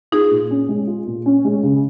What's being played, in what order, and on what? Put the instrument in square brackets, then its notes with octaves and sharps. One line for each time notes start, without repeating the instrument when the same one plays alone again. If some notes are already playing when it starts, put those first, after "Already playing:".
[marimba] D#4 G#4 [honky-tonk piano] F4
[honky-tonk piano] A#2
C#4
G#3
F4
A#2
C#4
G#3
C#3